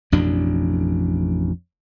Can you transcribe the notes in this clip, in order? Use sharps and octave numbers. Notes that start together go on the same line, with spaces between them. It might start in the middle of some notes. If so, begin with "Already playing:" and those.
A1 F2 B2 D4